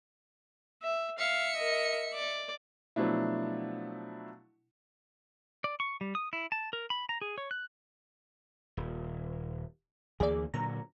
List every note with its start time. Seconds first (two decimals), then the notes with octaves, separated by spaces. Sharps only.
0.82 E5
1.18 E5 F5 C#7
1.56 A#4 D#5
2.14 D5
2.96 B2 F3 F#3 A3 D4 E4
5.64 D5
5.80 C#6
6.01 G3
6.15 D#6
6.33 E4
6.52 A5
6.73 A#4
6.90 B5
7.09 A#5
7.21 G#4
7.38 C#5
7.51 F#6
8.77 D#1
10.20 D2 E3 A#3 G#4 D5
10.54 A#2 D3 F#3 A#5